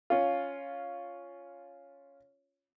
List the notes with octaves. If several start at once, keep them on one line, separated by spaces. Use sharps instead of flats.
C#4 F4